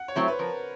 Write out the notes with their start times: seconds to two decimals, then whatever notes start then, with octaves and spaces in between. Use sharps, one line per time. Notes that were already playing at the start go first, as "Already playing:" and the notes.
Already playing: F#5
0.08 C#5
0.16 F#3 A3 C4 E4 C5
0.28 B4
0.39 F3 A#4